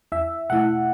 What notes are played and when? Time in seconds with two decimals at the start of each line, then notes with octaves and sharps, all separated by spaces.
0.12 E2 E5
0.50 B2 A3 E4 F#5